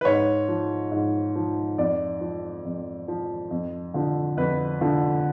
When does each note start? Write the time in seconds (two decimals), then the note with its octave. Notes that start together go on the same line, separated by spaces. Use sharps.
0.01 B4
0.05 G#2 C#5
0.49 F3
0.92 G#2
1.36 F3
1.78 F2 D5
2.21 F3
2.65 F2
3.08 F3
3.51 F2
3.94 D3 F3
4.37 F2 B4
4.81 D3 F3